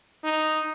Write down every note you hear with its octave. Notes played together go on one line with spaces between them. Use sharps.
D#4